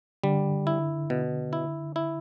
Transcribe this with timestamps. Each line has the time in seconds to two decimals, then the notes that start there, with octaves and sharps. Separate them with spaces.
0.24 D3 G3
0.67 E4
1.10 B2
1.53 E4
1.96 E4